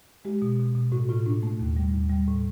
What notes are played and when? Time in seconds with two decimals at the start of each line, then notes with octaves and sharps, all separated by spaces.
0.25 G#3 G4
0.42 B2
0.59 B2
0.75 B2
0.92 A2 F#4
1.09 A2 F4
1.26 A2 D4
1.43 A3
1.60 D#2
1.77 G3
1.94 D#2
2.10 G3
2.28 A2